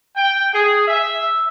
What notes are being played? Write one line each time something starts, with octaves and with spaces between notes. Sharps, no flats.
G5
G#4
E5